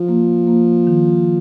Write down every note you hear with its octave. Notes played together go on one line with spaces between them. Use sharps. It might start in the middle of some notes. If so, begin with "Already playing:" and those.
Already playing: F3
A#3
A#3
D#3